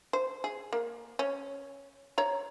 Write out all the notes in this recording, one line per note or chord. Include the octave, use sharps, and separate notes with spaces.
C5
G#4
A#3
C#4
C#5 A#5